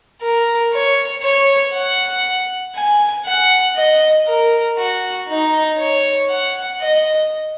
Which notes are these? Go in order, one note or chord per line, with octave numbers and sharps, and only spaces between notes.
A#4
C#5
C#5
F#5
G#5
F#5
D#5
A#4
F#4
D#4
C#5
F#5
D#5